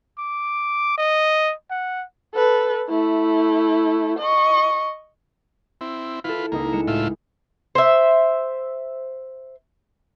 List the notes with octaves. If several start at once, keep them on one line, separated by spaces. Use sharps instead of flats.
D6
D#5
F#5
A4 B4
A3 E4
D#5 C#6
C4 E4
E4 F4 A4 B4
C#2 A#3 D#4 E4
G#3 C#7 E7
A2 F4 E5
C5 E5